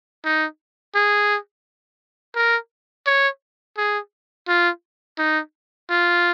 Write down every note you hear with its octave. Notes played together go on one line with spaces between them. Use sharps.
D#4
G#4
A#4
C#5
G#4
F4
D#4
F4